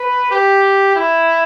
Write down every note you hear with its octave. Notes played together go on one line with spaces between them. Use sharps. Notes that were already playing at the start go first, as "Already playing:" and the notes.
Already playing: B4
G4
E4